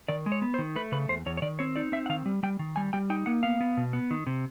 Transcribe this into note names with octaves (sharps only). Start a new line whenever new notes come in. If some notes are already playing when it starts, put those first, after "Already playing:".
D#3 D5
G#3
C#5
B3
C5
D#3
A3 B4
C#3 B4
E2 C5
E2 C#5
C#5
D#3 D5
C4 C#5
D#4 D5
C4 E5
F#5
D#3 F5
G3
G3 G5
D#3
G3 G#5
G3 G5
D#4 G5
A#3 F#5
B3 F5
B3
B2
B3
D#3
C3